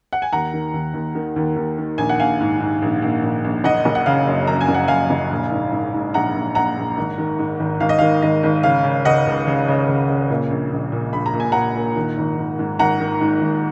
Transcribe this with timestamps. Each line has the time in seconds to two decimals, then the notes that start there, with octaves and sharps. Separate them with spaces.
0.13 F#5
0.22 G#5
0.33 D#2 F#5 A#5
0.53 D#3
0.74 D#2
0.94 D#2
1.15 D#3
1.36 D#2
1.56 D#2
1.78 D#3
1.98 A#1 G#5
2.09 F#5
2.19 A#1 F5 G#5
2.40 G#2
2.60 G#2
2.82 A#1
3.02 A#1
3.23 A#1
3.44 A#1
3.64 F#1 D#5 F#5
3.85 F#1
3.95 F#5
4.06 C#3 F5
4.27 F#2
4.47 F#2 A#5
4.61 G#5
4.68 F#1
4.74 F#5
4.88 F#2 F5 G#5
5.10 F#1
5.31 A#1
5.51 G#2
5.72 G#2
5.94 G#2
6.14 A#1 F#5 A#5
6.34 A#1
6.55 A#1 F#5 A#5
6.77 A#1
6.97 G#1
7.18 D#3
7.39 G#2
7.59 G#1
7.80 G#1 F5
7.89 D#5
7.99 D#3 F5
8.22 G#1 D#5
8.43 G#1
8.63 C#3 F5
8.84 C#3
9.05 C#2 D#5 F#5
9.27 C#2
9.47 C#3
9.68 C#3
9.89 C#2
10.09 C#3
10.30 A#2
10.50 A#1
10.72 A#1
10.92 A#2
11.13 A#1 B5
11.26 A#5
11.34 A#2
11.40 G#5
11.52 A#2 F#5 A#5
11.76 A#2
11.96 D#3
12.17 G#1
12.38 G#1
12.59 G#2
12.79 G#1 F#5 A#5
13.00 D#3
13.21 G#2
13.41 G#1